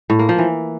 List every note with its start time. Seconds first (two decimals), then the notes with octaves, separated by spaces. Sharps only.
0.10 A2
0.19 A#3
0.29 F3
0.38 E3